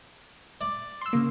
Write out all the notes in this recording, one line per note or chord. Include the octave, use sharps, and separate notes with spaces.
D5
C6 E6
C#3 A#3